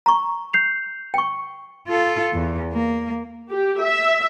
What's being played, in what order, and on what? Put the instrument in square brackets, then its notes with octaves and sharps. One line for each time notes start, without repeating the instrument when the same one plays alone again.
[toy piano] A#5 C#6
[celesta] G6 C7 F7
[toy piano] G5 C#6
[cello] F4 A4
E2
A#3
[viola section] G4
E5